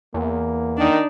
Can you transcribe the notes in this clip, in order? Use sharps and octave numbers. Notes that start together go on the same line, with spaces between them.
E2 A#3
D#3 D4 D#4